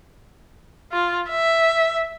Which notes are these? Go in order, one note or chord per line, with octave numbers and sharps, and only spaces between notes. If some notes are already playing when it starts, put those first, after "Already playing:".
F4
E5